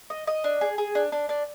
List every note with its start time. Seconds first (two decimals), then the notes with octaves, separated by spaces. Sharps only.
0.10 D#5
0.27 D#5
0.44 D4
0.61 G#4
0.78 G#4
0.95 D4
1.12 D4
1.29 D4